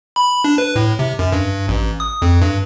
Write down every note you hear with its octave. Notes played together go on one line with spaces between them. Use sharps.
B5
D4
B4
A2
C3
F#2
G2
A1
D#6
F2
G2